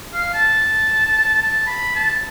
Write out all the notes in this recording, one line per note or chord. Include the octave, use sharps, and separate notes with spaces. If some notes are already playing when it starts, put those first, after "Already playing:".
F5
A5
A5
B5
A5